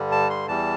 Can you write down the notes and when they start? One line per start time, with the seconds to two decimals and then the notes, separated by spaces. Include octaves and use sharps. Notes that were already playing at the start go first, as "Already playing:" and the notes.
Already playing: G2 D3 G3
0.12 A5
0.30 C6
0.48 E2 E3 G3 A5